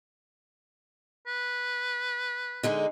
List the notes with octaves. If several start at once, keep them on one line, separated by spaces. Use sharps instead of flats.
B4
D3 G#3 D#4